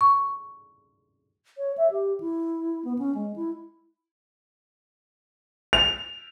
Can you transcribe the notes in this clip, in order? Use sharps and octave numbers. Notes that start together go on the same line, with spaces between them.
C#6
C#5
E5
G4
E4
B3
C#4
G#3
E4
F7